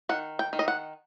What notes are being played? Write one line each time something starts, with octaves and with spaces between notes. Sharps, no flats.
D#3 F#5
G5
D#3
D#5
F#5